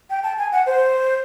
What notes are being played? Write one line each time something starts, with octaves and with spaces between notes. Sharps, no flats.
G5
A5
G#5
F#5
C5